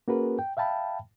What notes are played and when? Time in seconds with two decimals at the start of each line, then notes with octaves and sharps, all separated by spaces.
0.08 A#3 C#4 F#4 G#4 A#4 B4
0.39 G5
0.57 E5 F5 G5 A5 B5